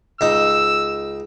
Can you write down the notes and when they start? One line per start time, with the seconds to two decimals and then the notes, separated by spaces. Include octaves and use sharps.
0.21 C#2 D#4 E6